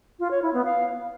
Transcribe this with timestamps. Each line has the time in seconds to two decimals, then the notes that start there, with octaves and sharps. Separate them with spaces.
0.20 F4
0.31 C#5
0.42 E4
0.54 B3
0.65 F5